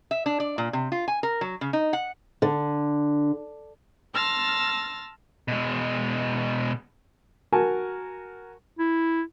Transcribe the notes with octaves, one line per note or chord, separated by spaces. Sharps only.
E5
D4
D5
A#2
C3
F4
G#5
A#4
F#3
C#3
D#4
F#5
D3
A5 C6 E6 F6 A6 A#6
B2 G#3
F#4 A#4 G#5 A5
E4